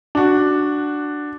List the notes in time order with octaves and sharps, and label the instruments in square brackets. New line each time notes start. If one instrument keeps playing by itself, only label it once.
[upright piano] D4 F#4